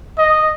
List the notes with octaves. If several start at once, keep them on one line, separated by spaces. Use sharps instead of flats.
D#5